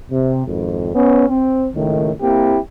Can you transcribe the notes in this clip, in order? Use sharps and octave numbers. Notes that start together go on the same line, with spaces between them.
C3
G#1 F2
B3 C#4
C4
C#2 A2 D#3
A#3 C4 E4 G4